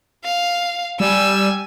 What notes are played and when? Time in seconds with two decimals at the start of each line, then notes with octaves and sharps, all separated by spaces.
0.25 F5
1.00 G3 G#5 E6